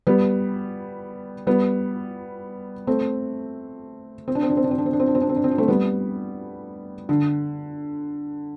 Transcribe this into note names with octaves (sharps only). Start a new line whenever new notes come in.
G3 B3
G3 B3
A3 C4
C4
D4
C4
D4
C4
D4
C4
D4
C4
D4
C4
D4
C4
D4
C4
D4
C4
D4
A3 C4
G3 B3
D3